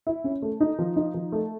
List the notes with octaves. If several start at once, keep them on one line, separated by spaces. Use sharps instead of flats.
E4
C#4
A3
D#4
F3
D#4
F3
A3